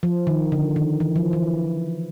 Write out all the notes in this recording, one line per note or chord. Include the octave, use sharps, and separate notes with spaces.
F3
D#3
D3
D#3
E3
F3
E3